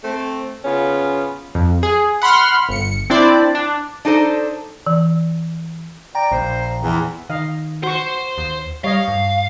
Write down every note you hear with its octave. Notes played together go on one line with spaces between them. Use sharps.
A3 C4
C#3 B3 C#4 F4
F2
G#4
F#5 B5 C6 F6
G1 C#7
C4 D4 E4 C5 D5
D4
D4 D#4 A4 C5
E3
D5 G5 A#5
A#1 C5
E2 E3
D#3 D#5 F5
F#4 C5 C6 C#6
D#2
G3 C#5 D#5 F5
G2